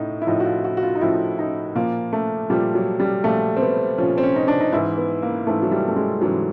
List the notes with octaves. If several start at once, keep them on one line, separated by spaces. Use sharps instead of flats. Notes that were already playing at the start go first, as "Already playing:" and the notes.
Already playing: A2 D#4
E4
A2 F3 D#4
F#4
F4
F#4
F#4
F4
D#4
A2 F3 E4
D#4
A#2 F3 A#3
A3
A#2 F3 G3
F#3
G3
A#2 F3 A3
C4
B3
A#2 F3 C#4
C4
C#4
D#4
D4
D#4
G#2 E3 E4
B3
A#3
G#2 E3 A3
F#3
G3
A3
G#3
G#2 E3 F#3